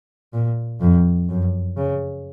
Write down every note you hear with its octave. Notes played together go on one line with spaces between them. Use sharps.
A#2
F2
F#2
C#3